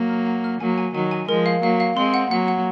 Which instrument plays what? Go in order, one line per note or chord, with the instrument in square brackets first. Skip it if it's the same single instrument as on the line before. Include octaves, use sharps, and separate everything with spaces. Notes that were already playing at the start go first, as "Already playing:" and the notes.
Already playing: [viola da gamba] F#3 A#3
[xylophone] F6
F#5
F6
[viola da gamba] F#3 A#3 [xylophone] G#5
[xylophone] G#5
[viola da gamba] D#3 F#3 [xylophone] G#5
[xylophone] G#5
[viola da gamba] F3 G#3 [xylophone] A#4
[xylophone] F5
[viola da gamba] F#3 A#3 [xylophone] F5
[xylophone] F5
[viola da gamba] G#3 C4 [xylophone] C6
[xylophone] F#5
[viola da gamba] F#3 A#3 [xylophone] F#5
[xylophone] F#5